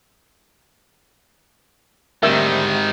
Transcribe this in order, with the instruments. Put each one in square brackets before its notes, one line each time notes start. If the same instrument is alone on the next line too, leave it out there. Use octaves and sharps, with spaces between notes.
[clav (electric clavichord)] D2 G3 E5 [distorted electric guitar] G#2 D#3 [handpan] C4 G4 A#4